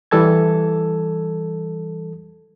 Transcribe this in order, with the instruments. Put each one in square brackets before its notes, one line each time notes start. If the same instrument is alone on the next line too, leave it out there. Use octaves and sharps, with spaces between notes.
[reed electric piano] E3 G3 A4 A5 G#6